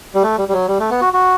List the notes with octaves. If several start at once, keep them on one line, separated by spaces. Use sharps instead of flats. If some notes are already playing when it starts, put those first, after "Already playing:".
G3
A3
G3
G3
F#3
G3
A3
B3
F#4
F#4